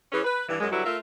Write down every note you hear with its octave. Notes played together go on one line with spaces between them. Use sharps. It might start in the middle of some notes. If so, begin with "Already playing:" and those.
E3 C#4 G#4
B4
G2 E3
F#2 G#3
D3 F#3 G3 E4 F#4 B4
A3 F4 A#4 E5